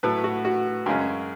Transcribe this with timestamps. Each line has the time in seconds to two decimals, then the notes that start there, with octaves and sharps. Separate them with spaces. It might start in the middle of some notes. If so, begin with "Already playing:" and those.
0.03 A2 F#3 A3 B4
0.24 F#4
0.45 F#4
0.86 F#2 C#3 G#3 C#4